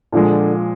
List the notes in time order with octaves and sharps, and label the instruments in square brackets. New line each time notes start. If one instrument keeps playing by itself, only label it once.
[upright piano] A#2 F3 G#3 [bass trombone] D3